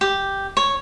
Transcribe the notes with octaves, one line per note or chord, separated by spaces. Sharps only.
G4
C#5